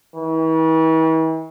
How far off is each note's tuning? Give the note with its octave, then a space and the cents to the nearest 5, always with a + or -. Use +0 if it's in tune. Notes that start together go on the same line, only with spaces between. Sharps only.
E3 -40